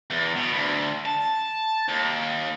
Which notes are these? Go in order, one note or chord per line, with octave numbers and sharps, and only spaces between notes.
E2
B2
D2
A5
D#2